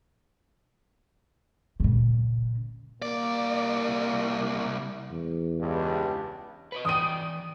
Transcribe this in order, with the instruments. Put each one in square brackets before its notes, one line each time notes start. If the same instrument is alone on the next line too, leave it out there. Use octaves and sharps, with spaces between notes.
[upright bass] A#2 C#3
[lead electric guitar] C2 D5 [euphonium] A#3
[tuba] E2
[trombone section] C#2 G2
[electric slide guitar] B4 C#5 D#5
[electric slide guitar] E3 D5 G5 [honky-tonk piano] D#6 D#7